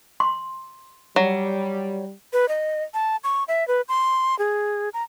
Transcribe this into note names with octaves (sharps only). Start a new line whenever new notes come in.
C6
F#3 G3
B4
D#5
A5
C#6
E5
B4
C6
G#4
A#5